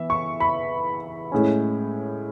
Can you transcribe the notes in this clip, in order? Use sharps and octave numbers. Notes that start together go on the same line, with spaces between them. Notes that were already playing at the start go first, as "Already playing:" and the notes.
Already playing: E3 B3 E5
C#6
B5
A2 G#3 C#4